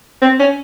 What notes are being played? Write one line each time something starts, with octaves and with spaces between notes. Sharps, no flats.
C4
C#4